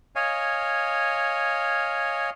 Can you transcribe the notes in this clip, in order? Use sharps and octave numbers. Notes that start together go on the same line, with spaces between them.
C#5 D#5 F5 G#5